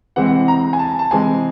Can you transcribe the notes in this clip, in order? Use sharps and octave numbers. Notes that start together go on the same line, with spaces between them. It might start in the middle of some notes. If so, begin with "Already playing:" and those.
C3 E3 G#3 C4 F#5
A#5
G#5
A5
A5
C3 E3 G#3 C4 G#5